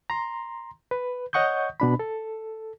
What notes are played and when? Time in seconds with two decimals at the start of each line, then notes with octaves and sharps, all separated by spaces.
0.10 A#5 C6
0.91 B4
1.33 C#5 D#5 F#5 C#6 D#6 G6
1.80 B2 D4 B5
1.99 A4